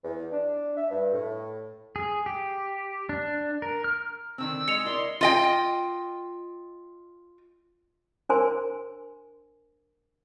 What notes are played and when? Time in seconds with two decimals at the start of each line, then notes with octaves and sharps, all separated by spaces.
0.04 E2
0.32 D4
0.77 E5
0.90 G2
1.13 A2
1.96 G#4
2.26 G4
3.09 D4
3.62 A#4
3.84 F6
4.38 D3 D#3 C4 E6
4.68 G#3 D#5 C#7 F7
4.85 E4 A#4 D5 C6
5.21 F4 D#5 G5
8.29 D4 A#4 C5 G#5 C6